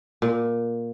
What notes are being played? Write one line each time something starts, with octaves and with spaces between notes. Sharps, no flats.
A#2